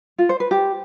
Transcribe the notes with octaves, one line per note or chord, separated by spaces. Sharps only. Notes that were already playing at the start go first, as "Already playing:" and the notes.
F4
C5
B4
G4